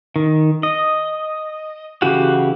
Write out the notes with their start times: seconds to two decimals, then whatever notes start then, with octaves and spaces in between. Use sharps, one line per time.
0.16 D#3
0.63 D#5
2.02 C#3 E3 F#4 G4 F#5